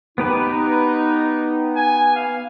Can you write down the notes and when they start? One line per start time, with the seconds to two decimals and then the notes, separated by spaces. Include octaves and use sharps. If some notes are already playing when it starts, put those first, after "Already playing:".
0.18 B3 D#4 G4 B4
1.76 G#5
2.16 F5